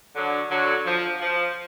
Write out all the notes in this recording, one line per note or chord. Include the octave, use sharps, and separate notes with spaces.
D3 F#3
D3 F#3
F3
F3